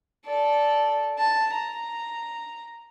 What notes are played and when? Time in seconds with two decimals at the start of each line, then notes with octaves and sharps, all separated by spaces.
0.26 A4 D5
1.18 A5
1.54 A#5